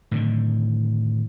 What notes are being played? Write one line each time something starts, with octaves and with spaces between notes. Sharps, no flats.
A2 D3 D#3